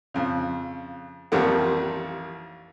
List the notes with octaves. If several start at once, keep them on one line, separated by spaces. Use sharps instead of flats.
F2 C#3
A1 F2 D#3 G3 A#3 F#5